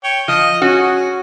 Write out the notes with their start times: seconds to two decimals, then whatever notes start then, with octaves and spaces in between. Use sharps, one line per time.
0.04 C#5 G5
0.28 F3 D#5
0.62 C#4 F#4 G#4